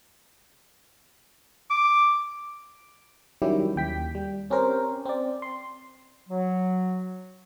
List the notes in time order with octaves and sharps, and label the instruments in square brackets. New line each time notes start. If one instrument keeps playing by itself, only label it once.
[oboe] D6
[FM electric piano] D#3 F#3 G3 C#4 E4 G4
D#2 G5 B6
G3
C4 C#4 G4 A#4 C5
C4 D5
C6
[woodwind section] F#3